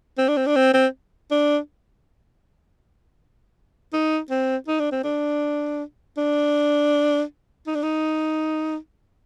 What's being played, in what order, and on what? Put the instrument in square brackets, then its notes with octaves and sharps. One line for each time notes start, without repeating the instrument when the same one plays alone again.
[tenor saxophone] C4
D4
C4
D4
C4
C4
D4
D#4
C4
D#4
D4
C4
D4
D4
D#4
D4
D#4